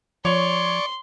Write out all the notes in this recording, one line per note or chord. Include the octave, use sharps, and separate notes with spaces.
F3 C#5 D5 C6 C#6